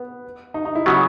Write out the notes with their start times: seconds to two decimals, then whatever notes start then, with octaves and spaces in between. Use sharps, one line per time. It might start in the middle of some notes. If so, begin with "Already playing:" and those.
Already playing: B3
0.54 D#4
0.65 D#4
0.75 E4
0.86 C#3 F#3 B3 F#4